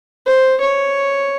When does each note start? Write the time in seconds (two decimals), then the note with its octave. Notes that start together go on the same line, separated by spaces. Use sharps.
0.26 C5
0.61 C#5